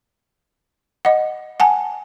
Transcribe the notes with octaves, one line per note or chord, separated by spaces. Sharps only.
D#5 F#5
F#5 G#5 A5